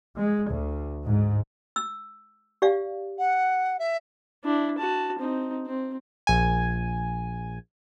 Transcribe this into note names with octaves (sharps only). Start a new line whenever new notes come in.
G#3
D2
G#2
E6
G4 D5 F5
F#5
E5
D4 E4
F#4 A5
C4 D#4
C4
A#1 G#5